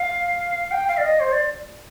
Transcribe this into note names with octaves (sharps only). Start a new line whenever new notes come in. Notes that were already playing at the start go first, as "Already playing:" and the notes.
Already playing: F5
G5
F5
D5
D#5
C5
D5